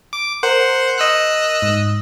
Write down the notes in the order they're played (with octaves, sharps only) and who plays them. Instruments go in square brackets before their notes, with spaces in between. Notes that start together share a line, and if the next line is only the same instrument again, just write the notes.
[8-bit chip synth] D6
[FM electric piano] A#4 [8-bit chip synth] C5 F#5
[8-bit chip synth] D#5 E6 F#6
[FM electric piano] G#2